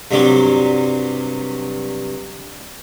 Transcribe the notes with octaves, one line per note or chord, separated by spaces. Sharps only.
G2 C3 F#3 G3